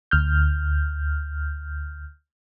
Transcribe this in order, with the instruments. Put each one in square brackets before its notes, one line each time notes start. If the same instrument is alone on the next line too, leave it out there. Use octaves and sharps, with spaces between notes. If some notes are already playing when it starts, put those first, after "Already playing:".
[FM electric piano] D2 F6 G6